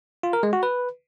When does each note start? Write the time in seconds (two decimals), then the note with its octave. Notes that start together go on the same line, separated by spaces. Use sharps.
0.23 F4
0.33 A#4
0.43 G#3
0.53 F#4
0.63 B4